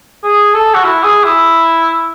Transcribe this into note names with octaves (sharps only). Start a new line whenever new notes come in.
G#4
A4
F#4
E4
G#4
E4